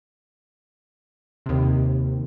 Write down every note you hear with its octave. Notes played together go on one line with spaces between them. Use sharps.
D#2 C3